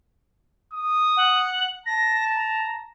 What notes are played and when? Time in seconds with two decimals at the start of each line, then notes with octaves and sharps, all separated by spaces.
0.74 D#6
1.17 F#5
1.86 A5 A#6
2.35 A#5